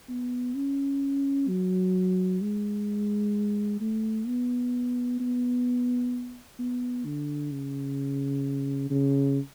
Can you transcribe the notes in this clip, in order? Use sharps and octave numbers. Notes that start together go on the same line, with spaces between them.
B3
C#4
F#3
G#3
A3
B3
B3
B3
D3
C#3
C#3